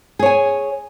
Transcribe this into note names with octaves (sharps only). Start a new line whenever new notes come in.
G#4 C#5 G#5